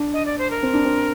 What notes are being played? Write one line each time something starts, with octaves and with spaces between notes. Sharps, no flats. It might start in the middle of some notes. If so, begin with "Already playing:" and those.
Already playing: D4
D#5
D5
C5
A#4
C4
D4
C4